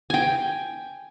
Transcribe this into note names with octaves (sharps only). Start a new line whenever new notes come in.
G5 G#5